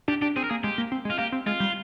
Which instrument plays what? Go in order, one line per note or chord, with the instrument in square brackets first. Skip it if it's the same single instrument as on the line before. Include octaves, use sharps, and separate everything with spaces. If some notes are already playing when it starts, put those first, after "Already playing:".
[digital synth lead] D4 [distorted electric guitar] G4
[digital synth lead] D4 [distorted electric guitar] G4
[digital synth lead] C4 [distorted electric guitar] G#4
[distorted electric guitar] A#4
[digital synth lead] A#3 [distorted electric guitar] G#4
[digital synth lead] G#3 [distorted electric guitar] G4
[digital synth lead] A#3
C4
G#3
[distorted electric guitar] F4
[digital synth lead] A#3 [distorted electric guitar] G4
[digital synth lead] C4
[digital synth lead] G#3 [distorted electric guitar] F4
[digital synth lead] G3